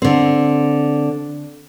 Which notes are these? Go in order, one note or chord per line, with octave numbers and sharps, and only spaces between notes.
D3 C4